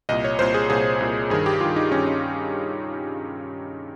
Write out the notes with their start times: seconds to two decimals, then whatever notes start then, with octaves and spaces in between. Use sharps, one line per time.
0.09 C2 A#2 D#5
0.24 C#5
0.39 C2 A#2 C5
0.54 G#4
0.70 C2 A#2 G#4
1.01 C2 A#2
1.30 G2 D#3 G#4
1.46 G4
1.60 G2 D#3 F4
1.76 D#4
1.91 G2 D#3 C#4
2.07 D#4